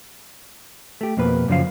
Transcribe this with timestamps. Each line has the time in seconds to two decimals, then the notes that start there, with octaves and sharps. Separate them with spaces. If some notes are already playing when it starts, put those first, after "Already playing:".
1.01 A3 G4
1.17 F2 B2 A#3 B4
1.48 F#2 C#3 F3 F5